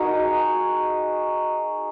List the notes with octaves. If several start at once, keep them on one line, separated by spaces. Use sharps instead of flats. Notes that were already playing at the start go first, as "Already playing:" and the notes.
Already playing: D#4 F#4 G#4 A#4